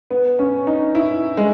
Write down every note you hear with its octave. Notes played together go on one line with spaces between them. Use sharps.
B3
C#4
D#4
E4
G#3